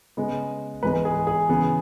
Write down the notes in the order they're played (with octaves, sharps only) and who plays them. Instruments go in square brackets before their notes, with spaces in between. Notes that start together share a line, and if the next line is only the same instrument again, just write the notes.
[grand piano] C#3 G#3 B3
G#2 E3 G#3 B3 B4
G#4
G#4
C#3 E3 B3